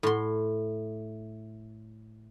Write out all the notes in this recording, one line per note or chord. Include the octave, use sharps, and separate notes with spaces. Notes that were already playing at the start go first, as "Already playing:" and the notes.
A2 C6